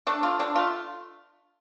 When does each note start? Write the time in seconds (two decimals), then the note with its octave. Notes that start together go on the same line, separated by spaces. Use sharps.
0.07 A3 D4
0.23 D3 F4
0.39 D3 D4
0.56 A3 F4